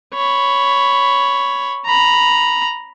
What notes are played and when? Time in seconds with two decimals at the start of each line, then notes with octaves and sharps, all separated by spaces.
0.14 C#5 B5
1.86 A#5 B5